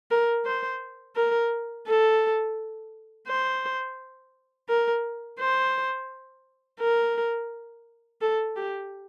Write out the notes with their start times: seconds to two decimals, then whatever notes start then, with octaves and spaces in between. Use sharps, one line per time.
0.11 A#4
0.46 C5
1.16 A#4
1.87 A4
3.28 C5
4.69 A#4
5.40 C5
6.80 A#4
8.21 A4
8.56 G4